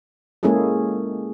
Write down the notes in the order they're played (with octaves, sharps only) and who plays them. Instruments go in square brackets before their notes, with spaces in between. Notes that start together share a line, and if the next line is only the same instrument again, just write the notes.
[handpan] G#3 A#3 C#4 E4 G#4 A4